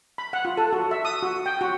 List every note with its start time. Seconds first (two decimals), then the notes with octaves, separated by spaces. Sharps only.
0.18 B5
0.33 F#5
0.45 F4
0.57 A4
0.73 F#4
0.91 E5
1.05 D#6
1.23 F#4
1.46 G5
1.61 F#4